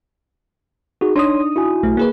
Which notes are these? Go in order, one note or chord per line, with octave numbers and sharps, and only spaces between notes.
D#4 F#4 G#4
D4 D#4 C#5 C6 D#6
E4 F#4 G#5
B1 A3
A#3 G#4 B4